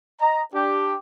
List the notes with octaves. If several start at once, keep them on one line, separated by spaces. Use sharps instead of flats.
D#5 A#5
D4 G4